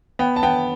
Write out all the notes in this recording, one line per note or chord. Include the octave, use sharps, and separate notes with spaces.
B3 G5
A5
B3 G5